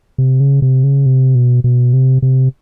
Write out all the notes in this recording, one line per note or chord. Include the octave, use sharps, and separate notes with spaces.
C3
C#3
C3
C#3
C3
B2
B2
C3
C3